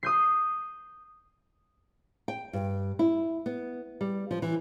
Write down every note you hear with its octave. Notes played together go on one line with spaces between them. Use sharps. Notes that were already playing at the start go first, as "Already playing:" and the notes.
D#6 G6 C7
G5
G2
E4
B3
G3
F3
E3